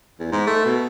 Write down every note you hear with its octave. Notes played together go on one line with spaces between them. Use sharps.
E2
G#2
A3
B2